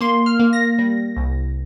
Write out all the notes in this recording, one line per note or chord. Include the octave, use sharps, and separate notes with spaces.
A#3 C6
F6
A#3
A#6
G3
C2